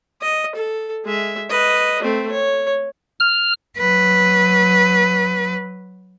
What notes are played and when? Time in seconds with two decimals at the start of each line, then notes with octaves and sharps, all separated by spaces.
0.22 D#5
0.56 A4
1.05 G#3 E5
1.50 B4 D#5
2.02 A3 C4
2.31 C#5
3.20 F6
3.78 F#3 B4